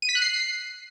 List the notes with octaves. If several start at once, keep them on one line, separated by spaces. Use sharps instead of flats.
D#7
B6
F#6
C7